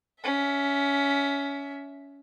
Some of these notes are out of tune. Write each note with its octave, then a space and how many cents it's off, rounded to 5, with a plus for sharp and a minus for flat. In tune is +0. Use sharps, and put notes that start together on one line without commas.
C#4 +20 E5 +0